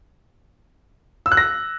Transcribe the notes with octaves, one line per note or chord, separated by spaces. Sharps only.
E6
F#6
A#6